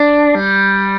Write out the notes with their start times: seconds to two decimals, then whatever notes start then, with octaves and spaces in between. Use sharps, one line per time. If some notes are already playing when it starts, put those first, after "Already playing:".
Already playing: D4
0.35 G3